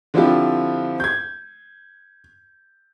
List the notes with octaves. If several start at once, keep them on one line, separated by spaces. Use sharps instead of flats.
D3 F3 C4 E4 F4 G4
G6 G#6